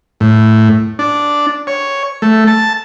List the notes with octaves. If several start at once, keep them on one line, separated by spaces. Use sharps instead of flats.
A2
D4
C#5
A3
A5